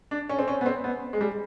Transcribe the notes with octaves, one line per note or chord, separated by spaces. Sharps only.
D4
C#4
C4
C#4
B3
C4
B3
G#3
G3